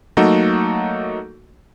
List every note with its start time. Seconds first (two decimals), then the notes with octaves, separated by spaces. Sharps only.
0.17 F#3 A3 A#3 D#4 F#4 A4